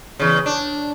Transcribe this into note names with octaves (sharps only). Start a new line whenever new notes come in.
E2 C#3
D4